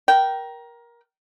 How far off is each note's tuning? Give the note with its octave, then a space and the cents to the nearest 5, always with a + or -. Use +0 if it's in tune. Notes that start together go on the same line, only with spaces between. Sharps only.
A#4 +20 G5 -15